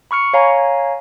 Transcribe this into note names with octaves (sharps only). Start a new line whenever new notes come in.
B5 C#6 F6 C#7
C#5 F5 G#5 A#5